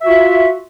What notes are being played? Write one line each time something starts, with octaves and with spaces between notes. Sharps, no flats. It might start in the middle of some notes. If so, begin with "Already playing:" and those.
F4 F#4 E5